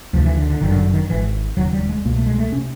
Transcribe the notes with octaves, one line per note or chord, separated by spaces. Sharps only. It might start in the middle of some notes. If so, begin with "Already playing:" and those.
D2 C3 F3
E3
D3
D3
G1 F#2 D3 D#3
D3
D#3
G#1 G#2 E3
E1 D#2 C#3 F#3
G3
G#3
C2 B2 A#3
A3
G#3
A3
C3 C#4